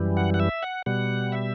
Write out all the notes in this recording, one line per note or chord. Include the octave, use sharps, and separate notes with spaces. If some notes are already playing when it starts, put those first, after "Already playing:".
Already playing: F#2 E3 G3
F#5
F#5
E5
F#5
B2 G3 F#5
E5